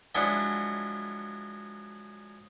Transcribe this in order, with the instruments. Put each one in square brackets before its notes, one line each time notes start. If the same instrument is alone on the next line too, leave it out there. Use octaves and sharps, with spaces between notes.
[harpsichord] F3 F#3 G#3 D4 E4 F#4